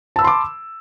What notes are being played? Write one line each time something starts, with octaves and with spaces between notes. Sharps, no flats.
A5 B5 C6 D6 E6